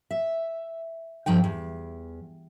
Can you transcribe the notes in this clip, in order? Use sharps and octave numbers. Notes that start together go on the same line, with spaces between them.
E5
G2 F3 D#4 G5
E2